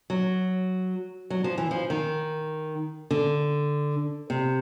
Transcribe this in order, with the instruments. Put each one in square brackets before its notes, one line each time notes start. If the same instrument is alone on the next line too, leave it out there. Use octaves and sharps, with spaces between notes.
[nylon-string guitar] F#3
F#3
F3
E3
F3
D#3
D3
C3